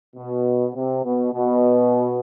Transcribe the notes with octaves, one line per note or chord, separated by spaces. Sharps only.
B2
C3
B2
B2